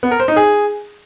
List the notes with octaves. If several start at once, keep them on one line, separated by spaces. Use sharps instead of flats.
B3
A#4
C5
D#4
G#4